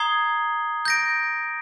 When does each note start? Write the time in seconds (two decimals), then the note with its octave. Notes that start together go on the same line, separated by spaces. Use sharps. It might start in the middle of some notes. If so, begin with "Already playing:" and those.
Already playing: A#5 D#6 G#6 C7 G7
0.85 G6 A#6 D7